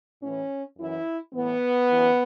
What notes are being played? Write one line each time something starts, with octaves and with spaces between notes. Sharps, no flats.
A2 E3 C#4
F#2 E3 E4
A2 E3 B3
F#2 E3